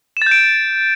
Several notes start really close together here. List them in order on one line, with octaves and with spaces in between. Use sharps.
E7 A6 G6 D7